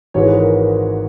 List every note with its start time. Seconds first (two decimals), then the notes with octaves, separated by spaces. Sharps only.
0.14 G#1 G#2 E3 G#3 C#5
0.28 B4
0.36 A#4
0.56 A#4